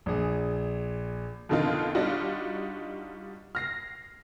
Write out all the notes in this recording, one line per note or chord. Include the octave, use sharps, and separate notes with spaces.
A#1 G#4
F2 B2 D3 D#3 D#4 F4
G3 D4 D#4 F4 F#4
F6 A#6 C7